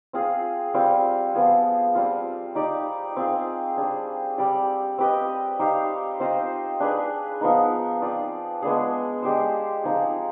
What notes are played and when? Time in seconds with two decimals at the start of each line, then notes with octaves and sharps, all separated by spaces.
0.13 C4 F4 G#4
0.74 G3 C4 F4
1.34 F3 B3 F4 G#4
1.95 G3 C4 F4
2.55 D#4 G4 D5
3.17 C4 F4 G#4
3.77 G3 D4 G#4
4.38 G3 C4 G4 D5
4.98 C4 G4 B4 D#5
5.59 D#4 G4 C5 F5
6.20 C4 F4 C5 D#5
6.80 D4 G#4 B4
7.41 F3 B3 D#4
8.02 C4 F4 B4 D5
8.62 G#3 B3 D4 G#4
9.23 G#3 D4 G4 C5
9.84 F3 C4 D#4 G#4